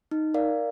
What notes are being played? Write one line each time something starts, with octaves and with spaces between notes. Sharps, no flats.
D#4
A#4 D5 F5